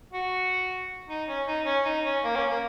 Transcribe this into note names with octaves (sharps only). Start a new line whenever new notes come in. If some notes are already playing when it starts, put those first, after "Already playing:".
F#4
D#4
C#4
D#4
C#4
D#4
C#4
A#3
C#4
A#3